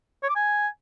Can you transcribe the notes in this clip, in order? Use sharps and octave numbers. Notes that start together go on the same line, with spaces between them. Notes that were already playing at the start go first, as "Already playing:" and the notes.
C#5
D6
G#5